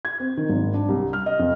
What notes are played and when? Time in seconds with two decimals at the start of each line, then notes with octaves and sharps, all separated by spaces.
0.05 G#6
0.20 C4
0.37 D#3
0.49 G#1
0.74 D4
0.89 C2
1.13 F6
1.26 D#5
1.39 F2